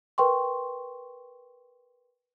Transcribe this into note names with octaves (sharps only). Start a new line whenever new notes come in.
A#4 B4 G5 C6 C#6